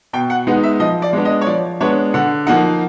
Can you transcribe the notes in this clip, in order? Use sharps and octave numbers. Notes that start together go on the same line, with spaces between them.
B2 G5
F#5
G#3 B3 D#4 F#5
E5
F3 D#5
D5
G#3 B3 D4
D#5
C#5
F3 D5
G#3 B3 D4 C#5
D3 F#5
F3 A#3 D#4 F#5